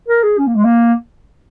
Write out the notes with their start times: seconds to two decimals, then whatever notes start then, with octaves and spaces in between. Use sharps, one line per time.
0.09 A#4
0.23 G#4
0.38 C#4
0.47 A#3
0.56 G#3
0.65 A#3